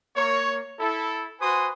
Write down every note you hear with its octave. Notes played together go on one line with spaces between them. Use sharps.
A#3 C#5
E4 A4
F#4 B4 C5 G#5 C6 D#6